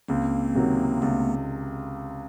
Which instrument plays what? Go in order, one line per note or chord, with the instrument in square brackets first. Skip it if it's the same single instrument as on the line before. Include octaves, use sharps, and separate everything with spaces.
[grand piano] C#2 [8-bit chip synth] A#3 C4
[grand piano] C3 D#3 F#3
[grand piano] C#2 [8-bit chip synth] A3 B3